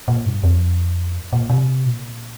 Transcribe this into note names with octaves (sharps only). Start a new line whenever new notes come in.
A#2
G2
F2
A#2
C3
A#2